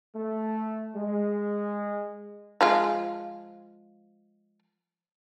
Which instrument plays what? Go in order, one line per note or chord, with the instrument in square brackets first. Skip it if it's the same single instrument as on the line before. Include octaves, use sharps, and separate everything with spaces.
[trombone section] A3
G#3
[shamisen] F3 G#3 F4